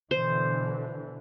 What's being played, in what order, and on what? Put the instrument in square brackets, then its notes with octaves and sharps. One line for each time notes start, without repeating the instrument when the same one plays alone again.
[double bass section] B2 D3 E3 [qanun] C5